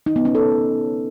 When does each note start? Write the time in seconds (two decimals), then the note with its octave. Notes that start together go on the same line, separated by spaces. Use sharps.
0.06 D#4
0.16 B3
0.25 C#4
0.35 A4